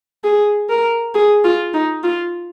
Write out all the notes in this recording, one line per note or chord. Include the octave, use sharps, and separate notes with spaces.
G#4
A#4
G#4
F4
D#4
F4